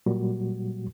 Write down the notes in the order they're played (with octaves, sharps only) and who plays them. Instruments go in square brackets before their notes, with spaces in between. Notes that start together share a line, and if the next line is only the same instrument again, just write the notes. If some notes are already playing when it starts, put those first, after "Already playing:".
[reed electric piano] A#2 F#3 G3 F#4